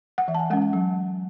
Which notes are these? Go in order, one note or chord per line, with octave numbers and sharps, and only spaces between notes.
F#5
E3 E5
A5
G#5
G#3 C#4 F#5
F#5
F#3